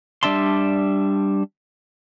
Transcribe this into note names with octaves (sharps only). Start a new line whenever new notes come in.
G3 D4 E5 A5 C6